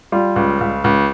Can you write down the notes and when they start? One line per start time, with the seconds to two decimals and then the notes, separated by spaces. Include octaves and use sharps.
0.12 G3 F4
0.36 C#2
0.61 C#2
0.84 C#2